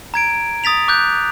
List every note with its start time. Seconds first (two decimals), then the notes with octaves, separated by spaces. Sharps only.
0.14 A#5 G#6 D7
0.64 D#6 A6 B6 F7
0.88 D6 F#6 G6